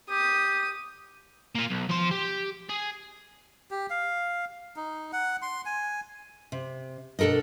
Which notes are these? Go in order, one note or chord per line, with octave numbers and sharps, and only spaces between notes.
G4 D#6
A#3 F4
B1
F3 C6
G4
G#4
G4
F5
D#4
F#5
C6
G#5
C3
B2 D4 A4 A#4 D#5